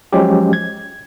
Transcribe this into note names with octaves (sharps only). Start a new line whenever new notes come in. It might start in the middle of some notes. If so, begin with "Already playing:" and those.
F3 F#3 G#3 C#4 G4
G#6